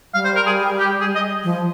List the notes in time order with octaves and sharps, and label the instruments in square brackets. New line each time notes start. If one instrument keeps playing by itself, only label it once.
[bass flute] G3 [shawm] F5
[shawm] C5
A#4
G#4
G4
G#4
D#5
[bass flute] F3